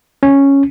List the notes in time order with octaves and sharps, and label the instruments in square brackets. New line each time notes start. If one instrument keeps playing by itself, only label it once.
[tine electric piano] C#4